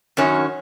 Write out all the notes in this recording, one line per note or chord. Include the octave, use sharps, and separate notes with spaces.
F#2 D#3 F#3 C#4